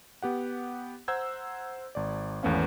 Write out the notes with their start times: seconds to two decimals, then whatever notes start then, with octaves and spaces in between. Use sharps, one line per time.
0.22 B3 G4 F#5
1.08 C5 F#5 A#5 E6 G6 G#6
1.95 G#1 D5
2.43 G#1 E2 A3 B3 C#4 F5